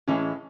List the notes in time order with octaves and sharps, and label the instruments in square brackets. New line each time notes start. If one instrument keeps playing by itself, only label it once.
[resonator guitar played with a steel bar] A2 E3 G#3 [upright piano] C#4